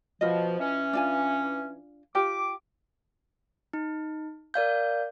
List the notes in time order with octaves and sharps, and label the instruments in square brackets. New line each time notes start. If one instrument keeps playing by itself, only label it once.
[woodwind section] B2 F3 [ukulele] F4 D#5
[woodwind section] E3 C#4
[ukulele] D4 F4 G#5
[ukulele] F4 G4 G5 [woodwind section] D6
[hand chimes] D#4
A#4 D5 F5 G6